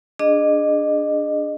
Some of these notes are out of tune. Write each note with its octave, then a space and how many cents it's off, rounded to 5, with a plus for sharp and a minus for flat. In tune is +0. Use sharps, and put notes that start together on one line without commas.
D4 +0 G#4 +0 D#5 -25